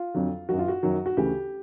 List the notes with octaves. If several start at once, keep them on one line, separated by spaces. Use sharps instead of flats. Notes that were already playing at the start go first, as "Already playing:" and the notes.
Already playing: F4
F2 D3 F#3
F#2 D#3 F#3 F#4
F4
F#4
F#2 D#3 F#3
F#4
D2 C#3 E3 G4